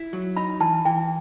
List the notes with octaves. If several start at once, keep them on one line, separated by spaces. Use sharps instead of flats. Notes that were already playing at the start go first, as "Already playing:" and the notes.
Already playing: E4
F#3
D#4 B5
E3 A5
E3 G5